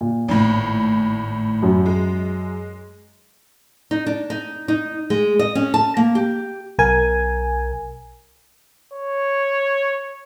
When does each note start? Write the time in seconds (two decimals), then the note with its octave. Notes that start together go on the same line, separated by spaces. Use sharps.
0.01 A#2
0.28 G#1 A2
1.62 F#2
1.86 G#3
3.91 D#4
4.06 D4
4.30 D#4
4.68 D#4
5.10 G#3
5.39 D#5
5.55 C#4
5.74 A5
5.97 A#3
6.15 G4
6.79 B1 A#4 G#5
8.93 C#5